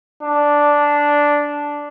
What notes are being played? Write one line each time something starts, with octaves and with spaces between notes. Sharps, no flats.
D4